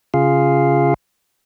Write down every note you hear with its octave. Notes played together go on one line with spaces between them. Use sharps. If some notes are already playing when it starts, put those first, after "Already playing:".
C#3 F4 G#4 F5